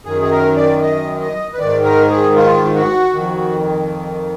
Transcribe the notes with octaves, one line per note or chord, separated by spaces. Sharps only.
F#2 D#3 G#4
G#4
A#4
D5
D#5
D#5
B4
G#2 D#3 D5
A#4
G#4
F4
F#4
F2 D#3